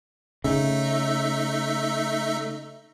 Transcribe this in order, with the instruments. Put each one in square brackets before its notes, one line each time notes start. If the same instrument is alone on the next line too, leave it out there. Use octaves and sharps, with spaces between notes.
[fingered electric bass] C#3 [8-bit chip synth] A3 D#4 E5